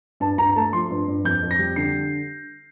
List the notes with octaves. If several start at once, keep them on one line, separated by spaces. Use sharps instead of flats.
G2 A5
G2 A#5
A3 A5
F3 C6
G2
G2
F2 G6
F2
A#6
G3
D3 C7